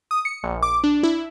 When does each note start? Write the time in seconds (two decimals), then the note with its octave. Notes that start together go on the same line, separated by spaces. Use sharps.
0.11 D#6
0.25 C#7
0.43 A#1
0.62 D6
0.84 D4
1.03 E4